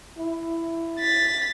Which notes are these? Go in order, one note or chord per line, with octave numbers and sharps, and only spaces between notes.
E4
A6 B6